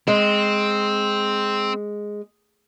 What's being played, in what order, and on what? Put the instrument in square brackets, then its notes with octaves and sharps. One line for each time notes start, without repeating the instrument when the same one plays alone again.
[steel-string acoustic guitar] G#3 [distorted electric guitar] C4